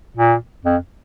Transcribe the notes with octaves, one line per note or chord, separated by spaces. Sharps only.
A#2
F2